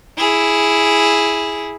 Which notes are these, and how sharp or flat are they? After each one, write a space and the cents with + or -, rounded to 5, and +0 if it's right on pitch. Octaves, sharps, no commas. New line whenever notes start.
E4 +0 G#4 +0